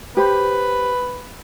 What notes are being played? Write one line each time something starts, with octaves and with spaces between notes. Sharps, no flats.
G4 B4 C5 B5